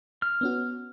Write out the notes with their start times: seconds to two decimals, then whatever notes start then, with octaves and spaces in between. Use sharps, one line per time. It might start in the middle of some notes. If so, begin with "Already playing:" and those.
0.22 F6
0.41 B3 C#4 F#4